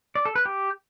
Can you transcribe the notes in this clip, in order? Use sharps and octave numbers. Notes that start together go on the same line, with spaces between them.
D5
A4
B4
G4